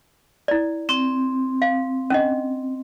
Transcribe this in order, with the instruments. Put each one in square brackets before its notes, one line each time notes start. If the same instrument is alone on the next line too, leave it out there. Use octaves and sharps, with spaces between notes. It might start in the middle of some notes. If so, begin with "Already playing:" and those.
[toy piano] E4 D5
[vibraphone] C4 [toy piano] C#6
[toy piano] F5
C#4 D4 D#5